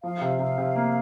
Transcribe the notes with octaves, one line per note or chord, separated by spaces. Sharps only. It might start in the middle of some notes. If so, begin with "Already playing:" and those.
F3 F5
C3
C3 F5
C3
A#3